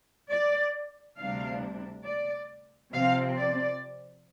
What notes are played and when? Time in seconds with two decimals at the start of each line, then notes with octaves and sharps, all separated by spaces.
0.29 D5
1.17 D2 C3 G3 D4 F5
2.05 D5
2.92 C3 F3 C4 F5
3.37 D5